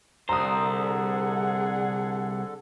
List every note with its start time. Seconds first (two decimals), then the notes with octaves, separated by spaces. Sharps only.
0.29 C2 D3 A4 C5 A#5 D#6
0.71 G#4 F#5